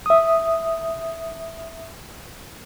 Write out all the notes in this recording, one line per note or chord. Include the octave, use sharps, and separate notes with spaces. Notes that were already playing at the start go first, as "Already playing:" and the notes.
E5 D#6